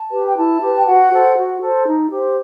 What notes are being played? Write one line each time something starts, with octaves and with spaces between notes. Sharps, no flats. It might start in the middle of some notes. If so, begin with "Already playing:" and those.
Already playing: A5
G4 B4
G5
E4 A5
G4 B4
G5
F#4 F#5
A4 C5
F#4
A4 C5
D#4
G4 C5